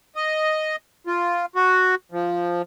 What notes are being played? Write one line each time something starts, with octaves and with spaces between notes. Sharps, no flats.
D#5
F4
F#4
F3